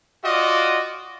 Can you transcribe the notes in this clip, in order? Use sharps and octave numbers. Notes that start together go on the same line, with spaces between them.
F4 F#4 D5 D#5